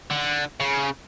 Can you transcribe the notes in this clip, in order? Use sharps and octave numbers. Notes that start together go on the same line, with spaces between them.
D3
C#3